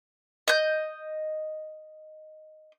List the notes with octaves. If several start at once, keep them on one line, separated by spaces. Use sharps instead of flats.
D#5 G6